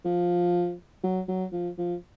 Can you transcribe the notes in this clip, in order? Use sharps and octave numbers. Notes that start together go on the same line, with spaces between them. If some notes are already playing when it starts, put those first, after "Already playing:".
F3
F#3
F#3
F3
F3